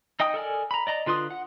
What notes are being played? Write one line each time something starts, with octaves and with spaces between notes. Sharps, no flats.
D#4 D#5 G5 D#6
A4 A#4 D5 G#5
A#5 B5
D5 D#5 A#5
D3 F4 B4 C6 D#6
F#5